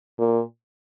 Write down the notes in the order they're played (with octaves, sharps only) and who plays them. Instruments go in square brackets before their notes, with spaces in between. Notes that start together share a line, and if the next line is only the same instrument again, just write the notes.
[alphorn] A#2